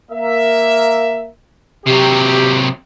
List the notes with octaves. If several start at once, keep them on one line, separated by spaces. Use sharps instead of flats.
A#3 A#4 E5
C3 F#3 G4